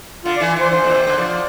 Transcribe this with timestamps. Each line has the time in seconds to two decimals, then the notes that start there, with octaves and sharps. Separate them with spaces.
0.24 D3 F4
0.37 E3 D5
0.57 E3 C5
0.72 D3 C5
0.84 A#2
0.94 C3
1.07 D3
1.18 F3 D5